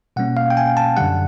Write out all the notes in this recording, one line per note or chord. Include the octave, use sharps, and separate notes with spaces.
B2 G3 A#3 C#4 F#5
F5
G5
G#5
A5
F#2 D3 G3 F#5